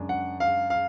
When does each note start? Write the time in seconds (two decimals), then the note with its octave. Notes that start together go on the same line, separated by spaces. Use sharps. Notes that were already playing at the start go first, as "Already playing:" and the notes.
Already playing: F#2 C#3 G#3 D4
0.09 F#5
0.40 F5
0.70 F5